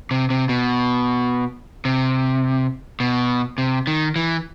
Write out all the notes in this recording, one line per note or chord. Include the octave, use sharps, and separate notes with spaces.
C3
C3
B2
C3
B2
C3
D#3
E3